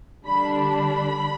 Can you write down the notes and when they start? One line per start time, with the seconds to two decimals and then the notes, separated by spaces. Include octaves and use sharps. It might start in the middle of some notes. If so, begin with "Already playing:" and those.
0.25 D3 G3 D4 B5
0.55 B5